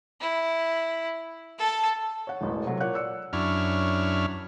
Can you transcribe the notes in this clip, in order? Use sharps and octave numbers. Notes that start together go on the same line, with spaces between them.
E4
A4 A5
C#5 F#5
E1 A1 E2
C3 F#3 A4
A#2 C#5 F#5 F#6
D5 E6 C#7
F#2 D4 E4 C#5 F6